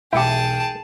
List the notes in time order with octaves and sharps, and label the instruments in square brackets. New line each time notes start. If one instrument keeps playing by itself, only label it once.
[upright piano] E1 B1 C#7 [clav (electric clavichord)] E4 G4 [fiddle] G#4 A5 [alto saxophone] G5